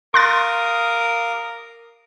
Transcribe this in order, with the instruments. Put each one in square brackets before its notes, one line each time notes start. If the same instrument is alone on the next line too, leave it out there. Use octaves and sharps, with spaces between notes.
[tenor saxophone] A#4 [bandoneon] F5 D6 D#6 [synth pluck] C6 F#6 A6